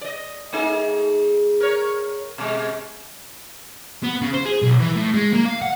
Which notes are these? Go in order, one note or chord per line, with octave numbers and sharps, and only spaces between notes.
D5 D#5
A3 D#4 G#4
A#4 C#5
B2 G#3
B3
C#3
C5
G#4
B1
E3
A2
G#3
A#3
F5
F#5